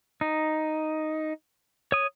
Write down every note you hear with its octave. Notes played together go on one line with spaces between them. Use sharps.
D#4
C#5 D#6